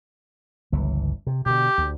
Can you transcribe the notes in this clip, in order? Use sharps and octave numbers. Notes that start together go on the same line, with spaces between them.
G1 C#2 E3
C3
B2 D3 G4
D2